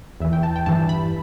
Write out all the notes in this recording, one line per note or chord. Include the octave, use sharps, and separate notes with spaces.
E2 E3 E5
G5
A5
G5
G2 E3 A5
B5